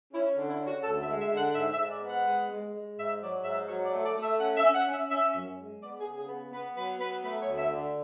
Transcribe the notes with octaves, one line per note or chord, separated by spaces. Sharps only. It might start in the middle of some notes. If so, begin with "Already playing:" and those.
C#4 E4
D3
E4
C#4
F#4
D2 A4
E5
G#3
E5
D3
F#5
G#2 E5
E5
G#2
D5
B3
F#5
G#3
G#3
G#3
G#2 E5
F#3 D5
G#2 E5
F#3 C#5
D5
A3
D5
A3
E5
C#4 F#5
E5
C#4
F#5
C#4
E5
C#4 E5
F#2
G#3
B3 D5
G#4
C#3
G#4
B3
B3 B4
F#3 B4
B3 B4
A3 B4
C#5
D2
E5
D3